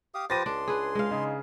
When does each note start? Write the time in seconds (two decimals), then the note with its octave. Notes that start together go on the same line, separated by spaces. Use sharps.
0.14 G4 F5 D#6
0.30 F3 G4 B4 C5 A6 A#6 D#7
0.46 C#2 D4 C6
0.68 G#4 B4
0.95 G#3 F5
1.11 C#3 D#4